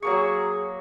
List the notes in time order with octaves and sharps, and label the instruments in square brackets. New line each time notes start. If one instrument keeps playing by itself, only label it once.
[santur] F#3 A#3 C#6 [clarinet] G#4